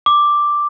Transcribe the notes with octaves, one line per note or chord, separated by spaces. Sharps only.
D6